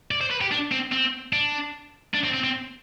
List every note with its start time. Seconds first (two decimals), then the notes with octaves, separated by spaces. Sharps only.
0.11 D5
0.21 C5
0.31 B4
0.41 G4
0.52 D4
0.72 C4
0.92 C4
1.33 D4
2.14 D4
2.24 C4
2.34 C4
2.44 C4